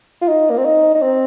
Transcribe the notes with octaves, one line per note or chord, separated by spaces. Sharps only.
F4
D#4
A#3
C4
D#4
D#4
C4